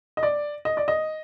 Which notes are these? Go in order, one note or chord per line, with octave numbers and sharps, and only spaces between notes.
D#5
D5
D#5
D5
D#5